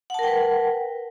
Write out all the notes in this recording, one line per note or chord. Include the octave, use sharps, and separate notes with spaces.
A#4 B4 F#5 G5 A5